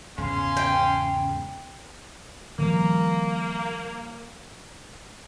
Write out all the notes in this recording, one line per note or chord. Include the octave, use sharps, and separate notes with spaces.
E2 G#2 C#3 B3 C#4 F5 C6
G5
D#3 F3 G3 A#3